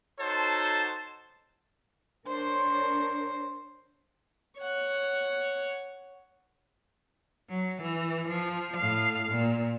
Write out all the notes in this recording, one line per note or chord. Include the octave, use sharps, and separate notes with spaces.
D#4 F#4 A4 C5 C#5 A5
D4 A#4 C5 C#5
C#5 F#5
F#3
E3
F3
A2 F5
A#2